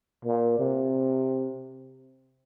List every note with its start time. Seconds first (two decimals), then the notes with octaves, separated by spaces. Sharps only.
0.25 A#2
0.59 C3